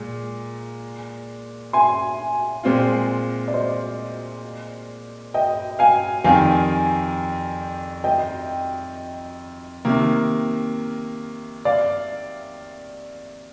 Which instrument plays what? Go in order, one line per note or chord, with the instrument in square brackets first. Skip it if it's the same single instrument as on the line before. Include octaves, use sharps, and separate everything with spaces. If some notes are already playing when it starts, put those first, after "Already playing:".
Already playing: [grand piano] A#2 G#3
[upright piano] G#5 C6
[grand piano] A#2 G#3 C4 F4
[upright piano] D5
C5 D#5
D#5 G5
F5 G#5
[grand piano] F2 D#3 G3 [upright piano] F5 G#5
[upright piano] D#5 G5
[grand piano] C3 D#3 A#3
[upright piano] D5 F5